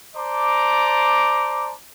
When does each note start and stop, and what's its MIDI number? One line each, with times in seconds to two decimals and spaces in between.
0.16 1.74 72
0.16 1.74 74
0.16 1.74 81
0.16 1.74 82
0.16 1.74 86